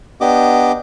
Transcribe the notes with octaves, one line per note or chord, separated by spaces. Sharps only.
B3 D4 G4 D#5 D6